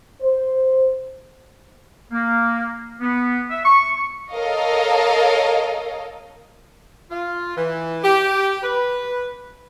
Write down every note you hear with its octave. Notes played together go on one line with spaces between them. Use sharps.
C5
A#3
B3
E5
C#6
C#6
A4 A#4 C#5 D#5 F5
F4
E3
G4
B4